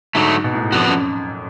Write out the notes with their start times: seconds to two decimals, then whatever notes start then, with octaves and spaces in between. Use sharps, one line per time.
0.15 G#2 D3 F#3 A3
0.44 B2
0.53 A2
0.57 G#2
0.72 F2 F3 B3 D4 F#4
0.87 F#2